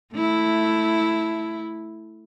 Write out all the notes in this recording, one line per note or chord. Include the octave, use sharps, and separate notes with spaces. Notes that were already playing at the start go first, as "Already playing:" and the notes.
A3 E4